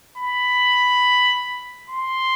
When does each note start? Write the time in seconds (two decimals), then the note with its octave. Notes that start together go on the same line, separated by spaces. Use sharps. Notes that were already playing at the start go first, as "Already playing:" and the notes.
0.18 B5
1.90 C6